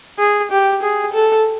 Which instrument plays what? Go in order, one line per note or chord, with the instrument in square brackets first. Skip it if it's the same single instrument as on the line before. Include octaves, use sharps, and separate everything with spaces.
[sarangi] G#4
G4
G#4
A4